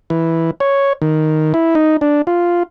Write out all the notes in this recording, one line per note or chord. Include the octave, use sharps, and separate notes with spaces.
E3
C#5
D#3
E4
D#4
D4
F4